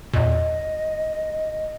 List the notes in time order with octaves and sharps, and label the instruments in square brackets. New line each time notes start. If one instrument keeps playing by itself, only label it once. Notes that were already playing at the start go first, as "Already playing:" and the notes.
[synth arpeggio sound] E2 A#2 [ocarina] D#5